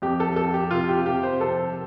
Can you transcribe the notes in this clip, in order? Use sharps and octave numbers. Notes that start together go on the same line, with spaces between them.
F2 G4
A4
F2 A4
G4
C3 F4
G4
C3 G4
C5
F2 A4